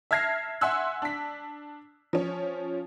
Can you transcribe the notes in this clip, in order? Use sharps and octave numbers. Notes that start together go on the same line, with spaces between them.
E5 A5 F6 G#6 A#6 C7
E5 F#5 G#5 C6 E6 F#6
D4 B6
F3 C#4